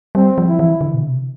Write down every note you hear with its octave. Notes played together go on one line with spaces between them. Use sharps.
G3 C4
F3
E4
E3
D3
B2
C3